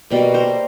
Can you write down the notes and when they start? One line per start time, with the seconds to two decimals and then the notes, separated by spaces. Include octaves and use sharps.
0.10 B2 G3 A#3
0.34 A#4 C5